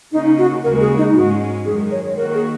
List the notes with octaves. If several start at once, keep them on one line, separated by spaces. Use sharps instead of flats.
C#3 A#3 C#4 D#4
F#4
D#2 C#3 G#3 F#4 A#4
G#4
D#4
G#2 G#3 C#4 F#4
F#2 D#3 G#3 G#4
C#5
D#3 A#3 F#4 A#4
G#4